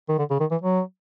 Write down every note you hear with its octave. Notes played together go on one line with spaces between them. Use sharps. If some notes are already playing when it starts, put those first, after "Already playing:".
D#3
D3
C#3
D#3
E3
F#3